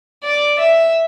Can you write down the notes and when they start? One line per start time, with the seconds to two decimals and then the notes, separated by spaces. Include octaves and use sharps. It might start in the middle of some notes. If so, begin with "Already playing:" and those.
0.23 D5
0.59 E5